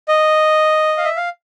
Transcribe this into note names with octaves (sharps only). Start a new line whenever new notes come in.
D#5
F5
E5
F5